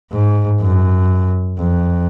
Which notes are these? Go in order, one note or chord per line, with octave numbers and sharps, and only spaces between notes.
G#2
F#2
F2